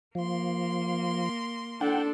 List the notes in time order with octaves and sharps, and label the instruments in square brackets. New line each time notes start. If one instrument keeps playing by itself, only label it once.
[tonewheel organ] F3 [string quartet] A#3 C6
[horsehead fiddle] D4 A4 [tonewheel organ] F#5 G5